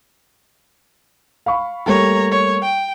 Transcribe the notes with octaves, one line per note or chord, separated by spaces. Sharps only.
F5 B5 C#6
G3 A3 A#3 C#5 A#5
C#5
G5